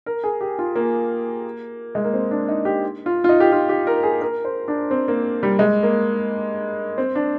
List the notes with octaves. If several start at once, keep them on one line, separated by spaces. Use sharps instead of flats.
A#4
G#4
G4
F4
A#3
G#3
A#3
C4
D4
D#4
G4
F4
F4
D#4
G4
F4
G4
A#4
G#4
A#4
C5
D4
C4
A#3
G3
G#3
A#3
C4
D4